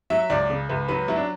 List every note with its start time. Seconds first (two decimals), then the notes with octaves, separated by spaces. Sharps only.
0.10 F#3 E5
0.30 C#2 D5
0.50 C#3
0.69 C#2 B4
0.88 F#3 B4
1.08 F#3 E4
1.16 D4